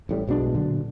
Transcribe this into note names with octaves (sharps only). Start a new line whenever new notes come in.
A1 A2 G3
B1 B2 G#3 D4
A#2 D3 F#3